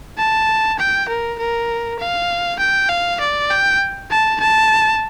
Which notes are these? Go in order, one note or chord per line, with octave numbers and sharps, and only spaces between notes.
A5
G5
A#4
A#4
F5
G5
F5
D5
G5
A5
A5